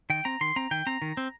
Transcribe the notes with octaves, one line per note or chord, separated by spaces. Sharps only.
D#3 G5
C4 A#5
D#3 C6
C4 A#5
D#3 G5
C4 A#5
D#3
C4